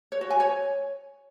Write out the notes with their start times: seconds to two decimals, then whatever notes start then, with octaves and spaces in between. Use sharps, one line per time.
0.12 C#5
0.21 F#4
0.30 G#5
0.40 C#5